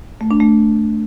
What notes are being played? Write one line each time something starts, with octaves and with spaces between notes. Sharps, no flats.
A3
D4
A3